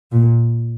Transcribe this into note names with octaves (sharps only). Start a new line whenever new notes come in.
A#2